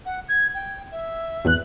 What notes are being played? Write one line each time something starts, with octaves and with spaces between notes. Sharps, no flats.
F#5
G#6
G5
E5
G#1 E2 F#6